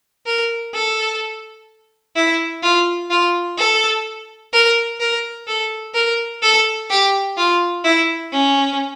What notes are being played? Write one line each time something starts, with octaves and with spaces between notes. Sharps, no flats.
A#4
A4
E4
F4
F4
A4
A#4
A#4
A4
A#4
A4
G4
F4
E4
C#4